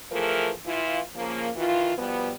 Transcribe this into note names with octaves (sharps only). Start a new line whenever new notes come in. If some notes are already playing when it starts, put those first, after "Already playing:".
E3 F3 A3 G#4 A#4
E3 E4 F4
C#3 F3 A#3
D#3 E3 F4
B2 F3 G3 B3